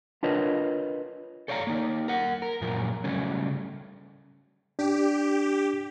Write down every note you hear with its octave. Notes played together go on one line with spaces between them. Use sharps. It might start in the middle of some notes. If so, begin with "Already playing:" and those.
D4 F4 A#4 B4 C#5 D#5
A4 C#5 D5 F5 G5 A#5
A#3 D#4
A#4 F#5
A#4
F#2 A#2 F3 A#4
C#3 F#3 G3 A3 C#4
D4 G4